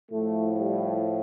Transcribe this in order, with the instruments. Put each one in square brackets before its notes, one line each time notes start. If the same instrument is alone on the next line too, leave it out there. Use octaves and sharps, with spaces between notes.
[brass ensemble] A2 F3 A3
G3